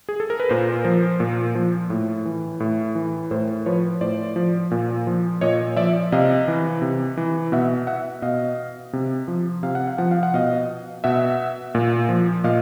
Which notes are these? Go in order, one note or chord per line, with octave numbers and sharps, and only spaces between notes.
G#4
A4
A#4
B4
A#2 A#4 C5
F3
A#2
F3
A2
E3
A2
E3
A2 A#4 C5
F3 B4 C#5
A2 C5 D5
F3
A#2
F3
A#2 C#5 D#5
F3 D5 E5
C3 D#5 F5
E3
C3
E3
B2 E5 F#5
E5 F#5
B2 D#5 F5
C3
F3
C3 F5
F#5
F5
F3 F#5
F5
F#5
B2 D#5 F5
B2 E5 F#5
A#2
F3
A#2 D#5 F5